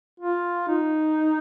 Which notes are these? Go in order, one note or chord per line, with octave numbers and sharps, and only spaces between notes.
F4
D#4